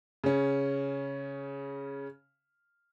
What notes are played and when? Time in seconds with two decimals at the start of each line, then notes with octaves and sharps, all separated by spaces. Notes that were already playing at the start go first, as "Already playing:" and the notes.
0.24 C#3 C#4